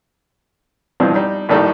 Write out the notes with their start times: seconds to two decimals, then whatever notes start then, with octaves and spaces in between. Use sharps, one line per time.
1.00 G2 B2 E3 F3 G3
1.15 G3 D#4
1.49 A#1 D#2 A2 G3 D#4 A4